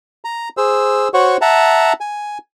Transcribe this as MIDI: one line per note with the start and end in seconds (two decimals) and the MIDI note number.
0.25 0.49 82
0.57 1.08 68
0.57 1.08 72
0.57 1.08 88
1.14 1.37 66
1.14 1.37 72
1.14 1.37 73
1.14 1.37 78
1.14 1.37 85
1.41 1.93 76
1.41 1.93 78
1.41 1.93 81
1.41 1.93 82
2.01 2.38 80